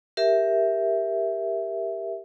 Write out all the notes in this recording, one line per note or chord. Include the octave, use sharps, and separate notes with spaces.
G4 A#4 E5